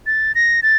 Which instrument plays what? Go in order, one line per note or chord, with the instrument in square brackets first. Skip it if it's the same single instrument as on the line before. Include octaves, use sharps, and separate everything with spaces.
[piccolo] A6
A#6
A6